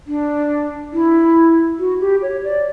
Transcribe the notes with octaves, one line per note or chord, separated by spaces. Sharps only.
D4
E4
F#4
G4
C#5
D5